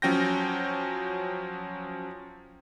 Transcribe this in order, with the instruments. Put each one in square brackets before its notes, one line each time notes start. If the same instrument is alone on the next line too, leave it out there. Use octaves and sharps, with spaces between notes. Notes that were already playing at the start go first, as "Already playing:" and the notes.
[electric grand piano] F3 F#3 C#4 G5 G6 A#6